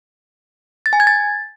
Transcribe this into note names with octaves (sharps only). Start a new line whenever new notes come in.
A6
G#5
G#6
A6